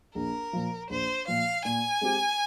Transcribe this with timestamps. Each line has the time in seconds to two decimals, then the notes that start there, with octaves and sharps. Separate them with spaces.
0.15 A#1 A#4
0.53 A#2 F3
0.90 A#1 C5
1.27 A#2 F3 F5
1.65 A#2 G#5
2.01 G#3 C4 G4